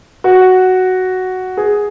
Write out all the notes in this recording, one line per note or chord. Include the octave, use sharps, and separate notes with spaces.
F#4
G#4